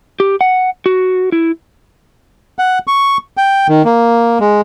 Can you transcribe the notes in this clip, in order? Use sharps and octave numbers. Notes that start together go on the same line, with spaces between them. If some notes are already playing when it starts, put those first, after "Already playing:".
G4
F#5
F#4
E4
F#5
C#6
G5
D#3
A#3
G#3